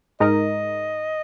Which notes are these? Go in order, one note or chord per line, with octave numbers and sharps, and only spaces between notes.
G#2 G#3 D#4 A#4 D#5